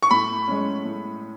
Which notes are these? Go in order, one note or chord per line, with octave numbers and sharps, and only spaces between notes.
C#6
A2 B5
G#3 C#4
A2